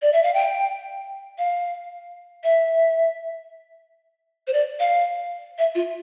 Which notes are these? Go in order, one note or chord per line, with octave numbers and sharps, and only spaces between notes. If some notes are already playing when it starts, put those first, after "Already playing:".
D5
E5
F5
G5
F5
E5
C5
D5
F5
E5
F4